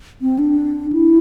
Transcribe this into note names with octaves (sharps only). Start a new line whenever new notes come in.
C4
D4
E4